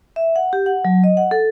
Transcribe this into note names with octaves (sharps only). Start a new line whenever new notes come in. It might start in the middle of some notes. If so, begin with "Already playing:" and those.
E5
F#5
G4
F#5
F#3
D#5
F#5
A4